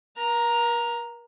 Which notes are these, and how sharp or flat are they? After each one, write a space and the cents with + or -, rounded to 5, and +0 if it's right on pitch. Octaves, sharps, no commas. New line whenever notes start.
A#4 +40 A#5 +0